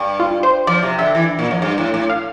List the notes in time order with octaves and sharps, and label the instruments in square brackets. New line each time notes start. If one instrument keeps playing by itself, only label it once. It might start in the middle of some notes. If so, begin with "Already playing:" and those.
Already playing: [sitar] G2
[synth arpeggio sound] F4
C5
[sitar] F3 [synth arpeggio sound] D5
[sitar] C3
[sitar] D3 [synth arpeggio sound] E5
[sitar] E3
A#2
F2
G2
A2
A2
[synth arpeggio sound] F5